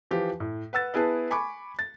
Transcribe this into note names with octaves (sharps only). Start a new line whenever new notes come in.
E3 F3 G4
A2
B4 F#5 E6 A6
B3 E4 G#4 B4 A5
G#5 B5 C#6 D6
A6